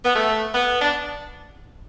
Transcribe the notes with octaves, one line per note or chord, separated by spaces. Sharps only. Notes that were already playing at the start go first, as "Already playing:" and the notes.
B3
A3
B3
D4